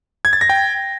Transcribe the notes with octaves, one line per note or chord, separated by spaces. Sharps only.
G#6
A6
A#6
G5